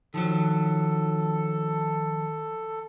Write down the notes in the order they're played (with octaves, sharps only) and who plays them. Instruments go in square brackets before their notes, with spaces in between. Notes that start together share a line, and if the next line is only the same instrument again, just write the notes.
[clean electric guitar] D#3 F3 F#3 [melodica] A4